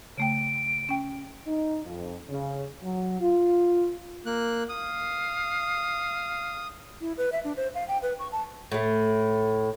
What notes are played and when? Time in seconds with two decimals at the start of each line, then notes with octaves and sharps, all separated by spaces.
0.18 C#3 A3 G5 D7
0.89 C#4 G5
1.46 D#4
1.85 F2
2.29 C#3
2.83 F#3
3.20 F4
4.26 A#3 F#6
4.69 F5 D#6
7.01 E4
7.18 B4
7.32 E5
7.44 D4
7.57 C5
7.75 F5
7.88 G5
8.02 B4
8.19 C#6
8.32 A5
8.72 A2 A3